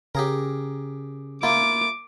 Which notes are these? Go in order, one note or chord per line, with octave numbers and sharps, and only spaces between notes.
C#3 G4 G#4 A#4
A#3 E4 F4 D6